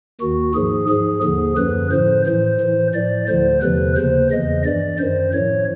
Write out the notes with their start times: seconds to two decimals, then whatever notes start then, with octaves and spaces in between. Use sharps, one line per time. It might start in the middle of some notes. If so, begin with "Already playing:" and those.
0.21 D#2 D#3 F#4
0.55 G#2 F3 G#4
0.89 G#2 F3 G#4
1.23 D#2 D3 F3 G#4
1.57 F#2 D3 F3 B4
1.91 A2 F3 C5
2.26 A2 E3 C5
2.60 A2 E3
2.94 A2 F3 D5
3.28 D2 D3 F3 C5
3.62 E2 C3 F3 B4
3.97 D#2 C#3 F3 C5
4.31 E2 C#3 E3 D#5
4.65 G2 E3 D5
4.99 F#2 D#3 C5
5.34 A2 F3 C#5